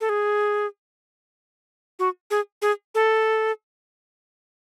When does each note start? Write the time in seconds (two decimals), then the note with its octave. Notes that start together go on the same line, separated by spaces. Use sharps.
0.01 A4
0.09 G#4
1.99 F#4
2.30 G#4
2.62 G#4
2.94 A4